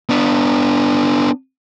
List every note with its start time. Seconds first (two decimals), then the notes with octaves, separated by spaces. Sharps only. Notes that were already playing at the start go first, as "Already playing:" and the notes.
0.10 B3 D4